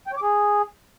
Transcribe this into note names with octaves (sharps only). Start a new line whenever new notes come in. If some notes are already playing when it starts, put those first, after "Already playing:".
G5
C#5
D6
G#4